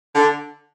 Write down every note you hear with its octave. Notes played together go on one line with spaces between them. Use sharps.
D3